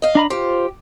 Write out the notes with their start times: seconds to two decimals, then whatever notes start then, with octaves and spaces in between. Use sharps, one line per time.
0.02 D#5 F5
0.15 D4 A#5 B5
0.30 F4 G4 C5